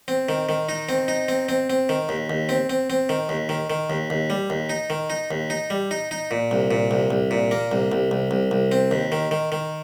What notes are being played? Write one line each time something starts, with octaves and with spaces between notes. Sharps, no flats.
C4
D#3
D#3
D#4
C4
D#4
C4
C4
C4
D#3
D#2
D#2
C4
C4
C4
D#3
D#2
D#3
D#3
D#2
D#2
G3
D#2
D#4
D#3
D#4
D#2
D#4
G3
D#4
D#4
A#2
C2
A#2
C2
C2
A#2
A#3
C2
C2
C2
C2
C2
C4
D#2
D#3
D#3
D#3